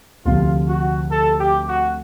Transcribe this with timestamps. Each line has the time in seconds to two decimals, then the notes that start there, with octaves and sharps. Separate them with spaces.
0.25 D2 C3 F3 F4
0.68 F#4
1.10 A4
1.39 G4
1.68 F#4